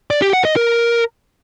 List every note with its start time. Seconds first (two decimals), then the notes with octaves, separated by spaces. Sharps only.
0.10 D5
0.22 G4
0.33 F#5
0.45 D#5
0.56 A#4